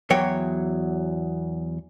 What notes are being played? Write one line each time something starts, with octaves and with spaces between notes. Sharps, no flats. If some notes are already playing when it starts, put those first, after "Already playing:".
E2 F#3 C#5 G5